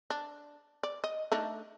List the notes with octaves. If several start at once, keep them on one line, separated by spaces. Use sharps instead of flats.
D4
D5
D#5
A3 D4 D#4